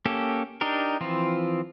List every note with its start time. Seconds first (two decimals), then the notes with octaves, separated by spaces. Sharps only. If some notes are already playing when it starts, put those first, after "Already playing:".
0.05 A#3 C#4 G4 A4
0.61 D4 D#4 G4 A#4
1.01 E3 F3 C4 F4